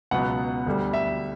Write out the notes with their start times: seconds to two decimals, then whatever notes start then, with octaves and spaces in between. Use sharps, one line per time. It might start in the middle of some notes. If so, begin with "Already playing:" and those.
0.11 C#2 B2 F#3 B3 F#5
0.67 D2 D3 G3
0.93 E5